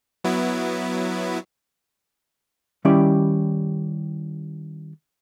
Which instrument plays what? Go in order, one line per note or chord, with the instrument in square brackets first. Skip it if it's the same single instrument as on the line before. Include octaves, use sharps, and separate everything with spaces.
[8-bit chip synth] F#3 B3 E4
[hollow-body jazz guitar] D#3 G3 C#4 E4 G4 D5